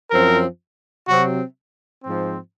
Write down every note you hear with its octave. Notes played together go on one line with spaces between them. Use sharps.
F#2 F3 C4 A#4
C3 F#3 C4 F#4
G#2 F3 C4